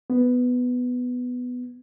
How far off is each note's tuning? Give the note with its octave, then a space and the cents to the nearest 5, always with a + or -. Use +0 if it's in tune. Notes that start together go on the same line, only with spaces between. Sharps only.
B3 +5